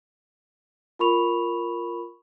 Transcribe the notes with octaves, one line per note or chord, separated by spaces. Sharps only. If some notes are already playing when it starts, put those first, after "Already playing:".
F4 A#4 B5 C#6 F7